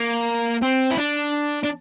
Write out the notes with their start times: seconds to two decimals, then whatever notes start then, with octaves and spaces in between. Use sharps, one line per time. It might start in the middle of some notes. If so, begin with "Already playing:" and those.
Already playing: A#3
0.62 C4
0.91 E4
0.98 D4
1.63 D4